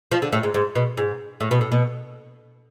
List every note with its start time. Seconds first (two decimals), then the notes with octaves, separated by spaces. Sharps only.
0.11 F3
0.22 D3
0.33 A2
0.43 G#2
0.54 G#2
0.76 B2
0.97 G#2
1.41 A2
1.51 B2
1.61 A2
1.72 B2